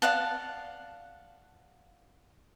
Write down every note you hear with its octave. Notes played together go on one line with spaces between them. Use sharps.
D5 F5 F#5 A5